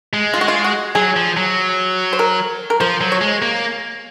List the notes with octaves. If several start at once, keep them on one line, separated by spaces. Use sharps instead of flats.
G#3
F4
F#4
F4
F#4
F#3 G#4
F3
F#3
C5
A#4
A#4
F3 C5
F#3
C#5
G#3
A#3